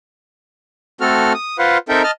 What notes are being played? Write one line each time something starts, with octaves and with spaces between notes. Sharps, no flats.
A3 C4 F#4 A4 F6
D#6
F4 B4 C5 F5 F#5
C4 D#4 A4 A#4 E5 G5
D#5 A5 F6